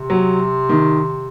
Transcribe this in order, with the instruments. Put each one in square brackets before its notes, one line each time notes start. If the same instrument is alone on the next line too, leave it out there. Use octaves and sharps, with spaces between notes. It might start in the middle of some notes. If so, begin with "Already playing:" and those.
Already playing: [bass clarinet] C3
[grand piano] F#3
D#3